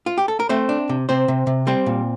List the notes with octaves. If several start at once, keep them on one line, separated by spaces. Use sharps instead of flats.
F4
G4
A4
A#4
A3 C4 C5
D4
C3
C3 C4 C5
C3
C3
G3 C4 C5
A#2